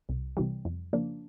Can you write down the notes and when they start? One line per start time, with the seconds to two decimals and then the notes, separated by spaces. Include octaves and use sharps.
0.09 C2
0.37 C3 E3 G3
0.65 F2
0.93 C#3 F3 A#3 D4